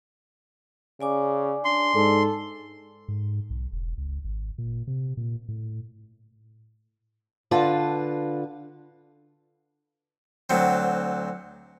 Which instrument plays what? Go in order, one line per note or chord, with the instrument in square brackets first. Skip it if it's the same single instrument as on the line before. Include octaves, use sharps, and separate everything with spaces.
[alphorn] C#3 [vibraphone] D5 G#5 D6
[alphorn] D4 [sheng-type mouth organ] C6
[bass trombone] G#2 [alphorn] A4
[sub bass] G#2
B1
E1
C#2
G#1
A#2
C3
A#2
A2
[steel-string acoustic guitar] D3 F4 B4 A5
[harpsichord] D2 F#3 C4